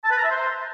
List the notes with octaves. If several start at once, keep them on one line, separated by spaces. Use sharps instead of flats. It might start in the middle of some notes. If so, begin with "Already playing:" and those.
A5
B4
A#5
E5
C5